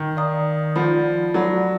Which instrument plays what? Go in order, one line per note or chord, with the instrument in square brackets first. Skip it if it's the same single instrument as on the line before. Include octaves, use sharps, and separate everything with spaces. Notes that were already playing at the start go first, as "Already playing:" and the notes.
Already playing: [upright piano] D#3
[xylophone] D5 F5 A#5 D#6
[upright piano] F3 [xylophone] D5 F#5 B5
[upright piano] F#3 [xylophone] D5 F#5 B5